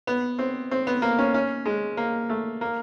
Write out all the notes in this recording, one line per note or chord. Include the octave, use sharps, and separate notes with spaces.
B3
C4
C4
B3
A#3
C#4
C#4
G#3
A#3
A3
A#3